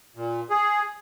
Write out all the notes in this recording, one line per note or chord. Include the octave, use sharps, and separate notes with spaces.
A#2
G#4